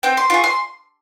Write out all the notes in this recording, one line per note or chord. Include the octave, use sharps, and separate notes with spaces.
C4 G5
C6
F4 G#4 C#6
C6